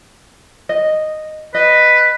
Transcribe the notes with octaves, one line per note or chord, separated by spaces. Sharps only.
D#5
B4 D#5